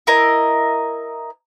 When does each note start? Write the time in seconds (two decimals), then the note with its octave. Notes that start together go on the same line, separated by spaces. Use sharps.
0.07 E4 A#4 D#5